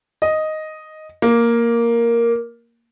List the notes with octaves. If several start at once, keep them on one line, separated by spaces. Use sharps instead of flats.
D#5
A#3